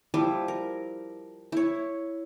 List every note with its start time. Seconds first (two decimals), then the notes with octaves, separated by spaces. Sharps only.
0.14 F3 G3 E4
0.48 A#4
1.52 E4 C#5